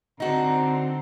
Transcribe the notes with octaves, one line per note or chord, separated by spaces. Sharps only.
D3 C4 D#4 F#4 A#5